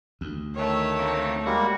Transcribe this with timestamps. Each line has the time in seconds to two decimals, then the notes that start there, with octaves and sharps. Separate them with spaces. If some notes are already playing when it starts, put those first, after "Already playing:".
0.21 D2
0.55 D#3 A3 C#5
1.00 A#3 C4 D#4
1.46 G3 G#3 A#3 F#4